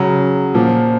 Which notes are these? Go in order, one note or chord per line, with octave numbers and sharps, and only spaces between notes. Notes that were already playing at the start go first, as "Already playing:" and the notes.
Already playing: C#3 F#3
A#2 F3